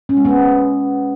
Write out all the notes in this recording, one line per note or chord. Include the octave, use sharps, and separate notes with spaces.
C#4
G#3
B3